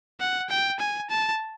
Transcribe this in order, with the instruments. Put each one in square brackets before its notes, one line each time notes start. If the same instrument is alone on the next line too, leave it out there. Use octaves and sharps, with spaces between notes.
[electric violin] F#5
G5
G#5
A5